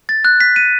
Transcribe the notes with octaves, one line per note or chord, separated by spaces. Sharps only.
A6
F#6
B6
D#7